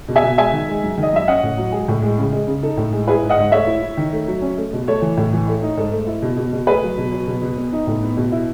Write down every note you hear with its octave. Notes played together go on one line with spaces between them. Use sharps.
B2
E5 G#5
B2
G#3 E5 G#5
D#3
G#3
F#2
D#3
D#5
F#2 E5
C#4 D#5 F#5
A2
F#3
G#3 G#4
A2
G#3
C#3
G#3
C#3
D#4 A4
A2
G#3
E4 G#4 B4
G#2
D#5 F#5
G#2
A3 C#5 E5
E4
E4
D#3
A3
F#3
C#4
A3
B2
A3 A4 C#5
E3
A2
E3
A3
D#4
G#2 A4
A3
E4
B2
B2
B2
A3 G#4 B4
F#3
B2
F#3
B2
B2
B3
D#4
A2
B3
B2
E4